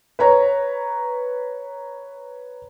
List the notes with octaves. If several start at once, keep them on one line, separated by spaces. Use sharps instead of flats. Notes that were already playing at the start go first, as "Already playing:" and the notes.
B4 C#5 A#5